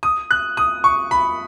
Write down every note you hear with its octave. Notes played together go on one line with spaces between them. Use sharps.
D#6
F#6
D#6
C#6
B5